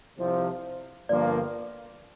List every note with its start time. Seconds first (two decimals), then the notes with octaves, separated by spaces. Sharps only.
0.17 C2 C3 F3
1.09 G1 G2 F3 A#3 D5